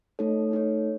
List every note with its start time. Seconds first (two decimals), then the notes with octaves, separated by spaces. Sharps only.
0.19 A3 D#4 A4 C#5
0.51 A3 D#4 A4 C#5